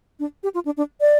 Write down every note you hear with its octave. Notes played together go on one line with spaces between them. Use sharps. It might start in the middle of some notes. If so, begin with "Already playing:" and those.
D4
G4
F4
D4
D4
D5